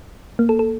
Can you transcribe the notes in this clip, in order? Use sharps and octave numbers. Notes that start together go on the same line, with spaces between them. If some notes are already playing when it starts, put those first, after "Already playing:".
A#3
A4
A4